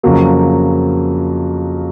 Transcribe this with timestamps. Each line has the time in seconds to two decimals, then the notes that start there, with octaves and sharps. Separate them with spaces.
0.03 F2 C#3 F#3 A#3